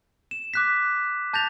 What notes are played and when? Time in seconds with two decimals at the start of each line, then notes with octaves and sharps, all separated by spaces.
0.31 E7
0.54 D6 F#6 B6
1.33 A5 G6 A6 A#6 F7